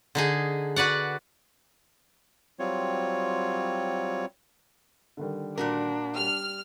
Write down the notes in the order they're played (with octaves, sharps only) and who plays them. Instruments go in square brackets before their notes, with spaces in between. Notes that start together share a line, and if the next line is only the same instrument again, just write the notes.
[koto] D3 D#4 G#4
F#4 B4 D5 F#5
[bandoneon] F#3 G3 C4 F4 C#5
[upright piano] D3 D#3 G3
[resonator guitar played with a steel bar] A#2 F#4 A#4 [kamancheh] D4
[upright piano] G3 G4 [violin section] F6